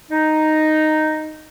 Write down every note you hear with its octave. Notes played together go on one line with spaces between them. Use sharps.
D#4